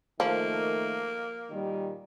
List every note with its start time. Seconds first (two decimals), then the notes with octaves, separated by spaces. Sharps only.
0.20 D#3 F3 A3 A#3
1.50 A#2 D#3 G3